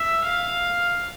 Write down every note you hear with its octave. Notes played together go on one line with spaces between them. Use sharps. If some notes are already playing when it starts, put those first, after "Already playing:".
Already playing: E5
F5